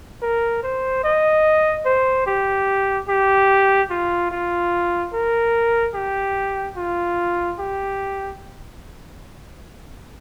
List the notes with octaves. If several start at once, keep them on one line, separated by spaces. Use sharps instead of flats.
A#4
C5
D#5
C5
G4
G4
F4
F4
A#4
G4
F4
G4